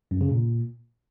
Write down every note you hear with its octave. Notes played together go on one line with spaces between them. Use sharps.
F#2
C#3
A#2